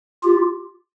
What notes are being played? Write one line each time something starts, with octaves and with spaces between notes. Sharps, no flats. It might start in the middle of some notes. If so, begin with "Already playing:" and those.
F4 G4